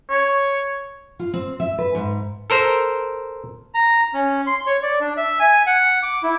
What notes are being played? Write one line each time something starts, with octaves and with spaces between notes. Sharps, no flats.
C#5
F4
C4
E5
B4
G#2
A4 A#4 C5
A#5
C#4
C6
C#5
D5
D4
E5
G#5
F#5
D6
E4